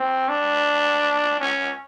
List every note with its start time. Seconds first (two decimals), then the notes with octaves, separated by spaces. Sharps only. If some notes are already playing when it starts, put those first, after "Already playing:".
Already playing: C4
0.29 D4
1.40 C#4